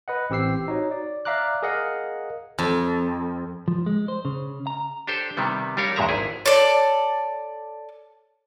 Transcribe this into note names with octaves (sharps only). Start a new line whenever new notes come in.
B4 D#5 F#5
A1 C4 G4 E6 C7
D#4 F#4 C#5
D5
D5 E5 F5 A#5 D6 F#6
G#4 A#4 D#5 F5 F#5
F2
F3
G#3
C5
C#3
A#5
D4 G4 A4 C5
C3 D#3 G3 B3
G3 D4 G4 A#4 C#5 F5
E2 G2 A#2 G#3 E5 A#5
G#1 E4 G#4
A4 C#5 D5